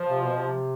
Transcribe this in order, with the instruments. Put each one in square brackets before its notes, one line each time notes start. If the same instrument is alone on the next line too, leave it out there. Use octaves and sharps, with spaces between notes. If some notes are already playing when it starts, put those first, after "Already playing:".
Already playing: [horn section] F3
[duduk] C3
B2
C3